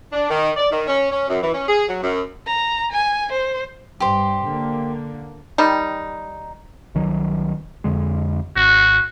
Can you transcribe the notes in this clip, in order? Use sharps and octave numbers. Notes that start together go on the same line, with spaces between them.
D4
D#3
D5
D#3
C#4
C#4
F#2
E3
C#4
G#4
F#3
F#2
A#5
G#5
C5
G2 G4 C5
D3 A#3
D#3 G3 D#4
C2 D#3 F#3
F2 D3 G#3
G#1 F#4